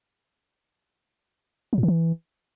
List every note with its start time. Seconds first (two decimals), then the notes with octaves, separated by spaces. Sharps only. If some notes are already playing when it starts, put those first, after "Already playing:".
1.73 F#3
1.78 A2
1.83 D#3
1.88 E3